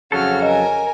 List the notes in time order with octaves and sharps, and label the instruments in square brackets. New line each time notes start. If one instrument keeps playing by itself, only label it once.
[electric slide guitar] F2 F#3 A4 [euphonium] C#3 [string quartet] F#4 F6
[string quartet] A#4 G#5 [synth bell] D#5